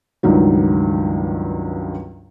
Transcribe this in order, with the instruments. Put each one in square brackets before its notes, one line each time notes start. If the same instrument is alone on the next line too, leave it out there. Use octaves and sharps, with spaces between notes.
[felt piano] C#2 G2 D#3 F#3